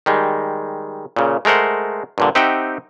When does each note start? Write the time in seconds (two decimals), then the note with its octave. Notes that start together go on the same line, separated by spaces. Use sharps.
0.06 D#3 G3 G#3
1.16 A#2 C#3
1.45 G#3 A3 A#4 C5 F#5
2.18 G2 A#2 D3
2.35 C4 D#4 G4 E5 F#5 G5